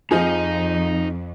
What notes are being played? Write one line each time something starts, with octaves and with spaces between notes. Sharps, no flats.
F2 F3 D#4 F4 G#4 D#5